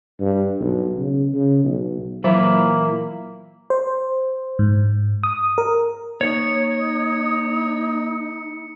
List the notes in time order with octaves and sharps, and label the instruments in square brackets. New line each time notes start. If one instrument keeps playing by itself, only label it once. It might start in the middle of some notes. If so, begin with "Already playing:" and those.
[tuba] G2
B1
C#3
C#3
B1
[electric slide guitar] A#2 E3 E4 [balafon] F#3 [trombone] A#3
[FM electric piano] C5
G#2
D#6
A#4
[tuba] A#3 [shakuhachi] D#4 [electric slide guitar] C#5 [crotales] C#7